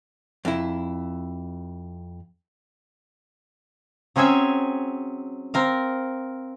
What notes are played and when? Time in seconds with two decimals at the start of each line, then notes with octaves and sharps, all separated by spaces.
0.45 F2 E4
4.16 F#3 C4 C#4 G#4 C#5 E5
5.54 C4 A#4 F5